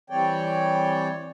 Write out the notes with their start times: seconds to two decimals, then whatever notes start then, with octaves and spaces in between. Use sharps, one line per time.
0.10 E3 G3 C4 C#5 D5 G5